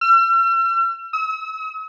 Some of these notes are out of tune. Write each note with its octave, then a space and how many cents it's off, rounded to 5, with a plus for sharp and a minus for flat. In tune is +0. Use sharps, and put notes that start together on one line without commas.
E6 +45
E6 -45